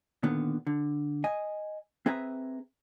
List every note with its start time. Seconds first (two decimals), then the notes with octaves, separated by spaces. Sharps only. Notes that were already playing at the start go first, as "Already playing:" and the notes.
0.23 A#2 D3 D#3 B3
0.67 D3
1.24 D#5 G#5
2.06 C4 G#4 B4 E5 A#5